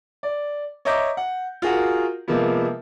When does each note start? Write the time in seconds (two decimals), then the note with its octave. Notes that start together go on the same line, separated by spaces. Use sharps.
0.23 D5
0.85 C#5 D#5 E5 A#5 D6 G6
1.17 F#5
1.62 F4 F#4 G#4 A#4 F#5
2.28 C3 F3 G#3 A#3 B3